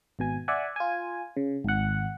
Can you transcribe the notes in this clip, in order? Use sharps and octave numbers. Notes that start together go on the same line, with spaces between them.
G#1 B2 G#5
D5 E5 F#5 G#5
F4 G#5
C#3
G#1 F#5